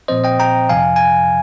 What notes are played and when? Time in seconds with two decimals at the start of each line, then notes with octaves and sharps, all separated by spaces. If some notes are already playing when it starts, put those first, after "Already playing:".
0.08 A#2 F3 C4 C5 D#5
0.24 D#5 G5
0.40 G5 A#5
0.69 F2 C3 F3 F5 G#5
0.96 G#5